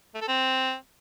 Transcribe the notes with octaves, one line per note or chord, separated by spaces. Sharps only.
A3
A4
C4